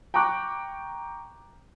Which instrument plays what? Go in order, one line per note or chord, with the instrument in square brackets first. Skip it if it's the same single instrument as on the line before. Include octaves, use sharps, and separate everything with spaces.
[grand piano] G5 A#5 C#6 D6 F#6